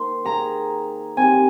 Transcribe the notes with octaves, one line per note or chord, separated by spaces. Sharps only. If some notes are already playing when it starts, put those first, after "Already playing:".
Already playing: D#3 A#3 A#4 C5 C6
D#3 A#3 G#4 A#5
C3 D#3 C4 G#5